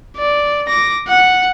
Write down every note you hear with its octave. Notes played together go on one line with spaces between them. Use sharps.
D5
D6 A#6
F#5